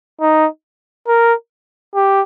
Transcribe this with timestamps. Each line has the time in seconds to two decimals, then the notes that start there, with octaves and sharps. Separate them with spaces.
0.21 D#4
1.07 A#4
1.95 G4